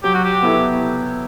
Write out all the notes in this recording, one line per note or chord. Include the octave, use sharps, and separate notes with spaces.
F#3 G4
F#4
G4
B3 E4 A4